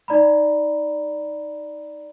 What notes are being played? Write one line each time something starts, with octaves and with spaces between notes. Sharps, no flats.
D#4 D5 A#5 B5